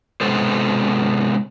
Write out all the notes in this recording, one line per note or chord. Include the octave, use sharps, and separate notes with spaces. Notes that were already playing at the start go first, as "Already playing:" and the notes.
C3 G#3 B3 A4 C5